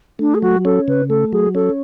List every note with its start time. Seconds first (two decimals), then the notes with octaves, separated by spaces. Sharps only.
0.19 A3 D4
0.34 G#4
0.42 F#3 F#4
0.65 C#4 A4
0.88 C#3 B4
1.09 A3 A4
1.33 F#3 G#4
1.55 C#4 A4